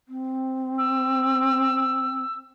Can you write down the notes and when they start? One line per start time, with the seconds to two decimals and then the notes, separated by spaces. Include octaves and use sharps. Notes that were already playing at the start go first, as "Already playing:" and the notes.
0.08 C4
0.78 E6